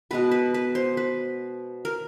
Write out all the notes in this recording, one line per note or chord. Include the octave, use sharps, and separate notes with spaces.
B2 G#3 B3 B4
B4
B4
C5
B4
A#4